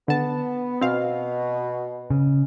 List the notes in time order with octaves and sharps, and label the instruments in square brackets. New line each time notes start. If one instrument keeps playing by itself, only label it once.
[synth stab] D3 A5 [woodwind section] B3
[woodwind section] B2 [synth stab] C4 F5
[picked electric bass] C#3